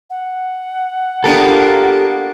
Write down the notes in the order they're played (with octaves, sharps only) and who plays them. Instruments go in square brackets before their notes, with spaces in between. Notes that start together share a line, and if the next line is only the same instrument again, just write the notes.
[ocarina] F#5
[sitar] A#3 B3 D4 [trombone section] F4 A#4 [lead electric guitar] G4 A4